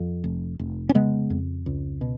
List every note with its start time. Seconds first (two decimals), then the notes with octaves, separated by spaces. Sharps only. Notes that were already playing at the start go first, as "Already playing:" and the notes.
Already playing: F2
0.24 F1
0.59 F1
0.89 C#4
0.95 C#3 G#3 B3
1.30 F2
1.66 C#2
2.01 B2